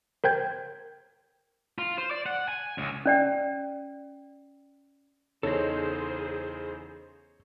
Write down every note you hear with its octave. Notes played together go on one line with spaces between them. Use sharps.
A#4 C5 G5 G6 G#6
F4
C5
D5
F#5
G#5
C#2
C#4 D5 G5
E2 C#3 D#4 G#4 A4 C5 C#5 D#5